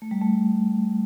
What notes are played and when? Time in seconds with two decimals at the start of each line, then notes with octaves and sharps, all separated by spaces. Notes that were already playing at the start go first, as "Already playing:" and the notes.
0.02 A3
0.11 G3
0.21 A3